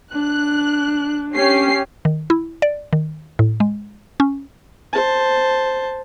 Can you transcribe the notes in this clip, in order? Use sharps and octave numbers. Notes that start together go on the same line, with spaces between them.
D4 F#6
C#4 G4 C7
D#3
E4
D5
D#3
A2
G#3
C#4
C5 A5